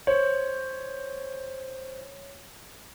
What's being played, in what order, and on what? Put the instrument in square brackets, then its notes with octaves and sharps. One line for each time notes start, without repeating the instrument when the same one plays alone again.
[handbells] C5 [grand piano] C#5